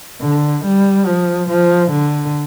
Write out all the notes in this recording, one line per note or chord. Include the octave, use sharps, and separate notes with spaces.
D3
G3
F3
F3
D3